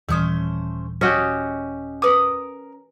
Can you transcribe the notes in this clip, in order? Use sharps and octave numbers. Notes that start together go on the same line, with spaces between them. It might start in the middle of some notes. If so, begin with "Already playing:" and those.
D#1 E3 A3 C#4 C5 D#6
C#4 F#4 G4 D#5
A#4 B4 D6 D#6